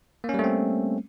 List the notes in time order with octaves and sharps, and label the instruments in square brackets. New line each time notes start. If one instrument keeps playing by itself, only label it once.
[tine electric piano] A#3
C#4
G3
A3
C4